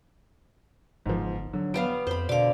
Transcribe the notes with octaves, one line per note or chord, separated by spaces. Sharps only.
G1 G#2 F3
D3 F#3
G3 B3 F5 D7
F2 C5 B5
B2 D3 D5 F5 D6